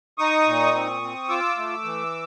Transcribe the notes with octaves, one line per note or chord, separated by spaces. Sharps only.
D#4 C#6 D#6
A#2
C4
C4
F4 D6 E6
A3
E3